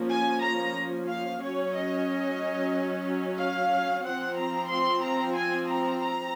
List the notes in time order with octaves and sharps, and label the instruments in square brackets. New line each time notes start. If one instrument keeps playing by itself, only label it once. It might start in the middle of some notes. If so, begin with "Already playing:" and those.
Already playing: [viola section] F3 A#3 C#4
G#5
A#5
F5
F#3 C#4 C#5
D#5
F5
F3 C4 F#5
A#5
C6
A#5
G#5
A#5
A#5